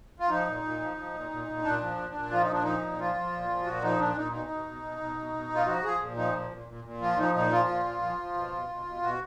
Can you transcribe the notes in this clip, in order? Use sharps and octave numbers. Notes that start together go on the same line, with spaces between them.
F4
F3 D#4
A#2
A#2
F3
F3
A#2
A#2
A#2
A#2 D4
F3
A#2
A#2
F3 F4
D#4
A#2 D4
F3 D#4
A#2
F3 F4
F3
A#2
F3
A#2 F#4
F3 D#4
A#2 D4
A#2 D#4
B2 D#4
B2
B2
B2
B2
B2
B2
B2
F4
F3 F#4
F3 G#4
A#2
F3 D#4
A#2
A#2
A#2
A#2
F3 F4
F3 D#4
A#2 D#4
F3 F4
A#2
F3
F3
F3
B2
B2
B2
B2
B2 F#4